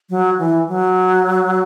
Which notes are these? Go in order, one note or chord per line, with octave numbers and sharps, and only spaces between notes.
F#3
E3
F#3